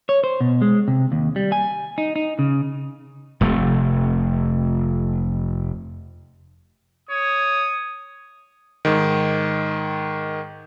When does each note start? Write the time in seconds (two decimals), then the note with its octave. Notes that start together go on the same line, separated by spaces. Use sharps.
0.09 C#5
0.24 C5
0.41 B2
0.62 G#3
0.88 C3
1.12 D#2
1.36 G3
1.52 G#5
1.98 D#4
2.16 D#4
2.39 C#3
3.41 F1 C3 A3
7.09 C#5 D#6
8.85 G#2 D#3